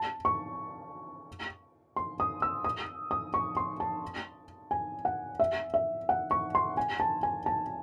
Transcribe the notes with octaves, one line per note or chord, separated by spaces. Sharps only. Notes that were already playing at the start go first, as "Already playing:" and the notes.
Already playing: A5
C#6
C6
D#6
E6
D#6
D#6
C#6
C6
A5
G#5
F#5
E5
E5
F#5
C#6
C6
G#5
A5
G#5
A5